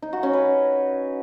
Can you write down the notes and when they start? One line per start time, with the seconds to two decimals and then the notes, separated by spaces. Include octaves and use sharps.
0.02 D#4
0.13 F#4
0.23 C#4
0.33 B4